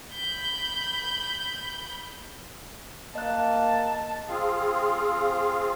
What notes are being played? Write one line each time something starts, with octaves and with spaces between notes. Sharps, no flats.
B5 G6
A#3 D#5 A5 F#6
C4 F4 G#4 F5